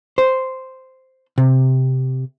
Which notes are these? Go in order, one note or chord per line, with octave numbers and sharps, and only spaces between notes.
C5
C3